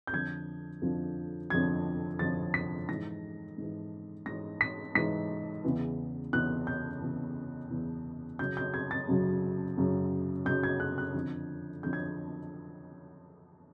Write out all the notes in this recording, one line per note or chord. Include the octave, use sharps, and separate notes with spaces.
G6
F2 D3 F3 G#6
F2 D3 F3
F2 D3 F3 G#6
F2 D3 F3 A6
B6
G#2 E3 A#6
G#2 E3
G#2 E3 A#6
B6
G#2 E3 B6
E2 C#3 E3
E2 C#3 E3 F#6
G6
E2 C#3 E3
E2 C#3 E3
F#2 C#3 F#3 G6
G6
G#6
A6
F#2 C#3 F#3
F#2 C#3 F#3
F#2 C#3 F#3 G6
G#6
F#6
F#6
F2 D3 F3
F2 D3 F3 G6
G#6